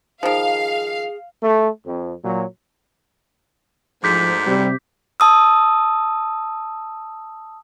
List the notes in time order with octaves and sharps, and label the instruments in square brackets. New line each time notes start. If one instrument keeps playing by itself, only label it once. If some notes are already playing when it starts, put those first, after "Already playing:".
[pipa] D#3 F3 [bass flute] G#4 [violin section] F5
[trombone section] A3
F2
A#2 F#3
[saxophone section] D2 G#2 [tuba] F3 [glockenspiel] D6 G6 B6
[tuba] C3 [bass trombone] G3
[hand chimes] A5 D#6 E6